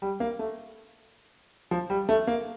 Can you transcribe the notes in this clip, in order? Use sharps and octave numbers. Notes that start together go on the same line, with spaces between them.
G3
A#3
A3
F3
G3
A3
A#3